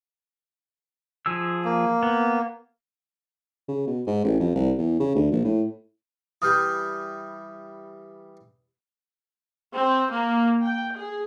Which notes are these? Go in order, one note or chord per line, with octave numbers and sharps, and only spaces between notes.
F3 G#4 E6
A#3
B3
C#3
B2
G#2
A1
F2
C2
E2
C#3
D2
A#1
A2
E3 G3 D#6 F6 G6
C4
A#3
G5
G#4